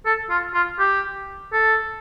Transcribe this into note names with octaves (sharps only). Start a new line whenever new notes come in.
A4
F4
F4
G4
A4